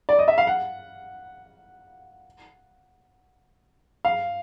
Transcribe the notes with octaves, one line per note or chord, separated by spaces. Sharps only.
D5
D#5
E5
F5
F#5
F5